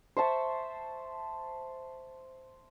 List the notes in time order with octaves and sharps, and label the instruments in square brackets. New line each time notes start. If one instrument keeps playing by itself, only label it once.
[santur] C5 E5 A5 C#6